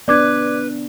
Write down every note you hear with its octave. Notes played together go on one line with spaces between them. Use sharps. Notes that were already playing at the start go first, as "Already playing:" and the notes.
B3 D4 B4 D5 D6 G#6